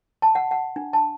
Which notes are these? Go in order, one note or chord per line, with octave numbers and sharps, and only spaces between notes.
A5
F#5
F#5
D4
A5